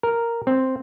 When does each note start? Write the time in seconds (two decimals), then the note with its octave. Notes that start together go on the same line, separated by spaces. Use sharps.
0.03 A#4
0.47 C4